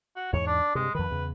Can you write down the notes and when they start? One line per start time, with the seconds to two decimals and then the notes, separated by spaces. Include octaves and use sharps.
0.16 F#4
0.33 E2 G#2 G#3 C#5
0.47 D4
0.75 G2 C3 G#3
0.95 F2 D#3 B4
1.11 E2 C#3